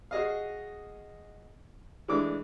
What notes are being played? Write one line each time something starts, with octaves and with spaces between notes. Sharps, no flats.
F#4 G#4 D#5 F5
E3 G#3 A3 D4 D6